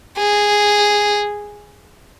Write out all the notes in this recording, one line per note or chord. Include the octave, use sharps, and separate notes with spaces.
G#4